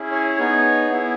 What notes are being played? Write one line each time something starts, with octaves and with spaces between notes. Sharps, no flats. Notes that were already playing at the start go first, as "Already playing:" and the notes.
Already playing: C#4 E4 G#4
C#5
B3 D#4 G#4
B3 E4 G#4